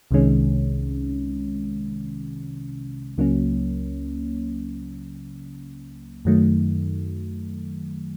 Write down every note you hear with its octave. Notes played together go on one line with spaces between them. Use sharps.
C2 C3 D#3 G#3 C#4
C#2 C#3 F#3 A#3 C#4
F#2 D#3 F#3 A3